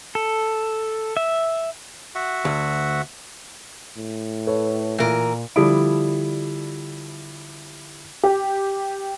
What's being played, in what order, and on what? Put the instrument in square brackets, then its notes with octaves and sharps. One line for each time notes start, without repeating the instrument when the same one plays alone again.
[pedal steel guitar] A4
E5
[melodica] F#4 E5 F#5
[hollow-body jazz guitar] D2
[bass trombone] A2
[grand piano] A4 B4 C#5
[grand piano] A#2 [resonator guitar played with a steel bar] E3 A#4
[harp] D3 D#6 D7 [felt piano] F3 G3 E4
[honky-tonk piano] G4